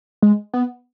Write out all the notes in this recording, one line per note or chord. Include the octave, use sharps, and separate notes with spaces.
G#3
B3